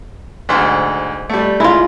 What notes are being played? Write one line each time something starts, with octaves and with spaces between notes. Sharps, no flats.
D2 G#2
G3 A3
G#3 E4 F4